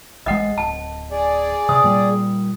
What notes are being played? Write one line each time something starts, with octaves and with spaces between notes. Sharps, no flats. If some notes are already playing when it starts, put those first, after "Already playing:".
A1 G#3 D#5 F#5
D1 A5
G#4 D5
C3 D#6
A#2 G3